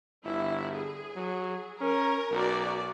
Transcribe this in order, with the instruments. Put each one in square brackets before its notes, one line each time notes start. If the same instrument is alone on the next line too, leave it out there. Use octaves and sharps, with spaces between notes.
[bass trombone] G1 [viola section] E4
[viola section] G#4
[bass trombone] F#3
[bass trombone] C#4 [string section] A#4
[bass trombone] B1 [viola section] F#4 D5